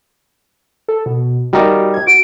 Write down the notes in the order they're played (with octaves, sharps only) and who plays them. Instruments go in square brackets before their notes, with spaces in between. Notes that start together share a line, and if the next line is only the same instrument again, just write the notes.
[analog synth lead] A4
B2
[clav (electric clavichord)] G3 D#4 A#4 [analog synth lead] F#4
[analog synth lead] G#6
[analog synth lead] F#4 [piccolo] D7